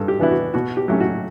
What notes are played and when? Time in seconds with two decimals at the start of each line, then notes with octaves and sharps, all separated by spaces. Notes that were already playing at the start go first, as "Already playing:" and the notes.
Already playing: G2 A4
0.08 G4
0.20 E3 B3 D4 E4
0.31 F#4
0.54 B2 F#4
0.77 G4
0.88 F#3 A3 C#4 G4
1.00 F#4